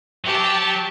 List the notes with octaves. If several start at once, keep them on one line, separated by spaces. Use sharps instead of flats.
F#3 G4 A5